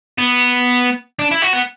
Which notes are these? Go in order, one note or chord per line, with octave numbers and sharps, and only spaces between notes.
B3
D4
E4
F#4
B3